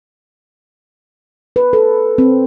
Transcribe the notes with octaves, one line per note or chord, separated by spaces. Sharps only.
B4
A4
C4